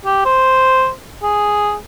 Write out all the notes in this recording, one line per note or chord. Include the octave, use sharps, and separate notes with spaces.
G4
C5
G#4